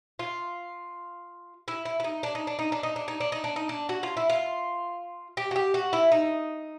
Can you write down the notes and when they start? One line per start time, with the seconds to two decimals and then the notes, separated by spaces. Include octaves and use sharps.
0.19 F4
1.68 E4
1.85 E4
2.00 E4
2.04 D#4
2.23 D4
2.35 D#4
2.47 D4
2.59 D#4
2.72 D4
2.83 D#4
2.96 D4
3.08 D#4
3.20 D4
3.32 D#4
3.44 D4
3.56 D#4
3.69 D4
3.89 F#4
4.03 F4
4.17 E4
4.29 F4
5.37 G4
5.51 F#4
5.56 G4
5.74 F#4
5.93 E4
6.12 D#4